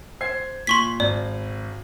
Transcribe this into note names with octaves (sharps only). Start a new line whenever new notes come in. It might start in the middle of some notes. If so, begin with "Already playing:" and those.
C5 G#6 C7
A#2 C6 C#6 B6
G#1 D5